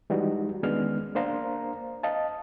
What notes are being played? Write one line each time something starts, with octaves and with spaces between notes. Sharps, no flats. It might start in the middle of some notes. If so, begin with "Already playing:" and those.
E3 G3 G#3 D#4 F#4
D#3 G#3 B3 C#4 D4 F6
A#3 D4 C5 F5 A#5
D#5 F5 A5